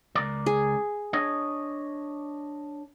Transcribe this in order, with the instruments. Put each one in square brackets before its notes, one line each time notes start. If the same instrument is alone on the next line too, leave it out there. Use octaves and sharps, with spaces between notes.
[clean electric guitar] C#2 A#4 D5
[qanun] G#4
[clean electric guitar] D4 C#5 D#5